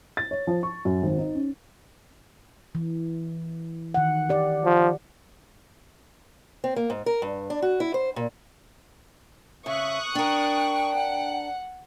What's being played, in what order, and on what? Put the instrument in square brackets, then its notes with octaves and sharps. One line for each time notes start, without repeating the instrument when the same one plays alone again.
[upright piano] A6
C#5
F3
C#6
F#2
G#1
D#4
C#4
[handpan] E3
D#3 F#5
G4 D5
[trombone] F3
[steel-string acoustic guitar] C4
A#3
G#2
A#4
G2
D4
F#4
E4
C5
A#2
[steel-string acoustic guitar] C#3 [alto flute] E5 [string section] C#6 D#6 F#6
[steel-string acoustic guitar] D4 A#4 [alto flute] G5
[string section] F#5